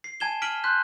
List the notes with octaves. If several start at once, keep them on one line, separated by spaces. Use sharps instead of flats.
C7
G#5 A5 G#6 E7 G7
F6 B6 D7 D#7 F#7 G7
C6 F#6 G6 B6